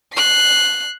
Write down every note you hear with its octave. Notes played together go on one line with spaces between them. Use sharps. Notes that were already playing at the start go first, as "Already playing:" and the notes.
F#6 C7